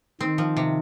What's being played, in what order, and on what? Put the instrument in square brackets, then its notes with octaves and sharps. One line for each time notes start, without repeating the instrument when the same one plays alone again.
[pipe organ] D#3 [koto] C4
[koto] F3
C3